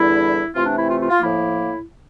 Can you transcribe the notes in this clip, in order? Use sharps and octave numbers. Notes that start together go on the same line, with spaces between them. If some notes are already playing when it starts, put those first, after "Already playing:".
Already playing: E2 D3 G3 E4
C3 E3 A3 C4 F4
D4
E4
F4
F4
F4
A2 F3 A#3 E4